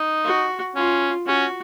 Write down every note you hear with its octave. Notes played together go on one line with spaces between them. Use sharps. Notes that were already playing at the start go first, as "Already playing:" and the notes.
Already playing: D#4
F#4
C#4 F4
C#4 F#4